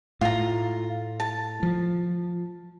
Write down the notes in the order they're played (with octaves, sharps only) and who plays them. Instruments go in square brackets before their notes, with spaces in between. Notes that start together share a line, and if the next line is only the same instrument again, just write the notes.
[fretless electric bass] A2 [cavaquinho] F4 A#5
[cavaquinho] A5
[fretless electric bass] F3